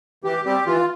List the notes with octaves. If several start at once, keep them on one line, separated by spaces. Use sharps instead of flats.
E3 G4
G3 C4 G4
E3 F4